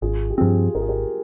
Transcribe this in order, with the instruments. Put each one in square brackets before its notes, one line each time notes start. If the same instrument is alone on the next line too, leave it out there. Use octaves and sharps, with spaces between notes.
[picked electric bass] G#1 [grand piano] F4 G#4
[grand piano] G4
[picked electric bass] G2 F3 C4 [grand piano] F4 G#4
[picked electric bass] G#1 [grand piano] A#4
[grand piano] G#4
G4 A#4